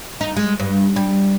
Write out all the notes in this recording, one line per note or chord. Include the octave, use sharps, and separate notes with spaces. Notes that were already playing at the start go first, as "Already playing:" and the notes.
D#4
G#3
G2
G3